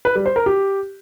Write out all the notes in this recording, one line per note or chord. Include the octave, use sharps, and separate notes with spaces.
B4
G3
C5
A#4
G4